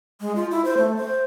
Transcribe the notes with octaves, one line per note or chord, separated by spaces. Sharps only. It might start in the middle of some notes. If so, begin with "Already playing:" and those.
G#3
F4
E4
C5
A3
C5